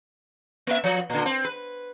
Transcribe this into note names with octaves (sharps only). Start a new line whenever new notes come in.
A#3 E5
F3
A#2 D3
C4
B4